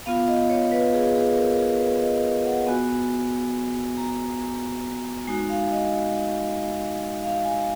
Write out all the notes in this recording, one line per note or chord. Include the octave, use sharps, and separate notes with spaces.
B3 F4 F5
D#5
C#5
B4
G#4
G#4
A#4
G#4
B4
D#5
F#5
B3 F#4 G#5
A#5
G#3 D#4 F#4 G#5
F5
D#5
F5
G#5